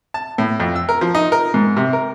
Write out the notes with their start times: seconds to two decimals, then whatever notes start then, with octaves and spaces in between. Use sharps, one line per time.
0.14 A5
0.38 A2
0.60 F2
0.76 E6
0.89 A#4
1.01 F3
1.15 D#4
1.32 A#4
1.54 G#2
1.77 C3
1.93 A#4